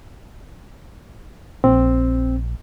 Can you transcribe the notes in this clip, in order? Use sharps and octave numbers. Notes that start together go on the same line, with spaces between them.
A#1 C4